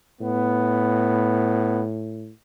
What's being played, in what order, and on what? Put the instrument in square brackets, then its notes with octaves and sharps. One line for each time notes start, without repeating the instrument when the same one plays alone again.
[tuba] A2 [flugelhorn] B3